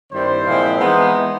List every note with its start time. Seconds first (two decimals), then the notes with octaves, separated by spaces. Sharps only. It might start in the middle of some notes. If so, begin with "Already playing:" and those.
0.11 G2 D#3 G3 C4 E4 C5
0.45 A#2 F3 G#3 C4 E4
0.79 E3 G#3 B3 D#4